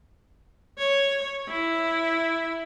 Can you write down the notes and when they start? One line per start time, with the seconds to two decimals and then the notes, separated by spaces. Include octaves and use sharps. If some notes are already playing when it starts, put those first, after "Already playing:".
0.78 C#5
1.49 E4